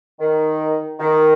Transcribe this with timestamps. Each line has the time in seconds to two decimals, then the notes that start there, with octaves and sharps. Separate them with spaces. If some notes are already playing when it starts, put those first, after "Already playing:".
0.20 D#3
0.99 D#3